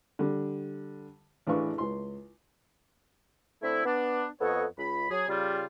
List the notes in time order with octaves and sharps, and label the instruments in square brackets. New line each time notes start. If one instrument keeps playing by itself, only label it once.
[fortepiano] D3 G3
A1 D4 G#4 B4 F5 C#6
C#2 C6
[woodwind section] D3 A3 C4 E4
B3 D4
F2 B3 A4 C#5 D#5 F#5
C#2 B5
F#3 G#4
C#3 G3 F4